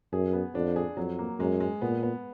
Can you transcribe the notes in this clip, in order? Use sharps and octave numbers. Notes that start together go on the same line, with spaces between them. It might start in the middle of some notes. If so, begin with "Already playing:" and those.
F#2 G#4
B3
F2 D4
G#4
F2 F#3
A#3
F#2 G#3
G#3
A#2 B3
B3